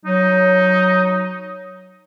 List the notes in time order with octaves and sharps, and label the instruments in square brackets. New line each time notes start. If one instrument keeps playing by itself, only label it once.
[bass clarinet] F#3 [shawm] D#4